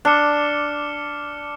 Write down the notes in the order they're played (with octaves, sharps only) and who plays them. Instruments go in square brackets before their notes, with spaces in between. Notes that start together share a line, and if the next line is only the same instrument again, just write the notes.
[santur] D4 [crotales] D6 F6 C#7 E7 G7